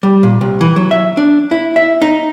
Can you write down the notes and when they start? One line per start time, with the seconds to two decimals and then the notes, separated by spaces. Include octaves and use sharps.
0.03 G3
0.23 A#2
0.41 C2
0.61 E3
0.76 F#3
0.91 E5
1.17 D4
1.51 E4
1.76 E5
2.02 D#4